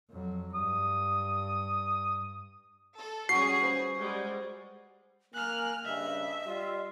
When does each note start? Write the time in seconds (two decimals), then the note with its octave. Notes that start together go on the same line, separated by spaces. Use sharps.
0.10 F2 F#3
0.55 G2 D#6
2.98 A4
3.29 G3 C#4 F#4 G#4 C7
3.61 B4 C5 B5
4.00 G3 G#3
5.34 A#3 G#5 F6 F#6
5.85 G2 C#3 D#5 E5
6.46 G3 F4